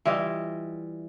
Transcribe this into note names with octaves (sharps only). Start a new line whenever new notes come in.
E3 G3 F4 D#5